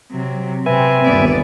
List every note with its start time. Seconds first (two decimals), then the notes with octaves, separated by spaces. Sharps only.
0.11 C3 F#3
0.66 C3 C4 B4 E5 G#5
1.04 G1 D#2 B3 D5